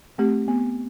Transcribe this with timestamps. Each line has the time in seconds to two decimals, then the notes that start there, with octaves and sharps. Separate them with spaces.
0.18 A3 C4 G4
0.48 B3